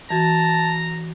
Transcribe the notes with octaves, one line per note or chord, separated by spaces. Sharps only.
E3 F#4 A5 A#5